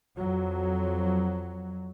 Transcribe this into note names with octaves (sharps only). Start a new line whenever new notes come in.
F2 F#3